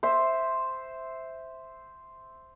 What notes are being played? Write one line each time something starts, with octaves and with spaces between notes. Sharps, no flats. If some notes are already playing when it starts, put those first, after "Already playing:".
C5 E5